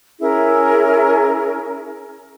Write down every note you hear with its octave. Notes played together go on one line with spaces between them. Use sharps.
C#4 E4 G#4 A#4